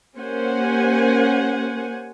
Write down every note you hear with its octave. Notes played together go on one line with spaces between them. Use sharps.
A#3 C#4 G4 C5 F#5 G#5